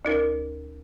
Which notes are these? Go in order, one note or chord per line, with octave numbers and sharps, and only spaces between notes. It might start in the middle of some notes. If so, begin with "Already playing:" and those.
D2 D#4 A#4